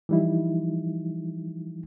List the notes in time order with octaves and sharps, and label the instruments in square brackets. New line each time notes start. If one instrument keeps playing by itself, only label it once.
[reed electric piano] E3 F3 G3 D#4 E4